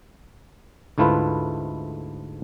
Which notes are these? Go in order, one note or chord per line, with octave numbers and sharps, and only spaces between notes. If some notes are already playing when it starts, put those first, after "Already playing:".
D2 G#2 A3 E4 F4 B4